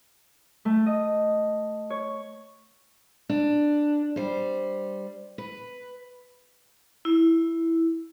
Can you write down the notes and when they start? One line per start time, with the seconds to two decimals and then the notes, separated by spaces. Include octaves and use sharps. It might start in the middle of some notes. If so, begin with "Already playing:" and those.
0.65 A3
0.86 D#5
1.90 C#5
3.29 D4
4.16 G3 C5
5.38 B4
7.05 E4